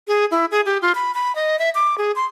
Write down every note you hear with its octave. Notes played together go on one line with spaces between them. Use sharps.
G#4
E4
G#4
G4
F4
B5
B5
D#5
E5
D6
G#4
C6